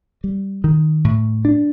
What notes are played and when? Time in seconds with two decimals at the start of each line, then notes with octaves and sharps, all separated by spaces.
0.24 G3
0.64 D#3
1.04 A2
1.45 D4